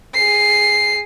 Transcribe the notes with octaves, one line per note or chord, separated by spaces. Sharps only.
G#4 C7